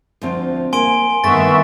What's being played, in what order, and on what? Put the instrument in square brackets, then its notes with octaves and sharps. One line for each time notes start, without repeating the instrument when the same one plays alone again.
[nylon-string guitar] D2 F3 C4
[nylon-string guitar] A#3 [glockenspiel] G#5 C6 D7
[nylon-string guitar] G2 D3 A3 [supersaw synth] D#3 B3 E5 [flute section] C#6 [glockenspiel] A6